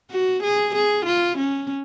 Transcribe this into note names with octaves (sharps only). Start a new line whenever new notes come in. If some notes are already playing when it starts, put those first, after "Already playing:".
F#4
G#4
G#4
F4
C#4